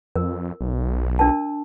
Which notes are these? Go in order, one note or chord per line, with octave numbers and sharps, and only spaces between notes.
F2 A#4
B1
D4 A#4 A5